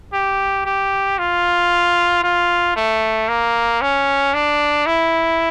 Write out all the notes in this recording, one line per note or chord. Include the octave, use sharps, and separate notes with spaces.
G4
G4
F4
F4
A3
A#3
C#4
D4
E4